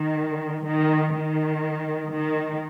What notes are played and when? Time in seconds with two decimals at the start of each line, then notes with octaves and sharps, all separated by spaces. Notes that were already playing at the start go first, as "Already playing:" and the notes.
Already playing: D#3
0.67 D#3
1.15 D#3
2.13 D#3